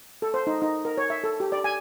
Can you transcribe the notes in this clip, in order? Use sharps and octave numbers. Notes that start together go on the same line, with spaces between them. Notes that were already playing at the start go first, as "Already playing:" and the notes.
A4
C5
D#4
D#4
A#4
C#5
E5
A4
G4
D5
G#5